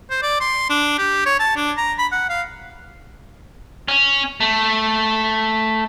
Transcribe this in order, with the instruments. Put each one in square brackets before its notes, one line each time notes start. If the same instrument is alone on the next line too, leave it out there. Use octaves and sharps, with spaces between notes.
[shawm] C5
D5
C6
D4
G4
C#5
A5
D4
A#5
B5
F#5
F5
[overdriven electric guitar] C#4
A3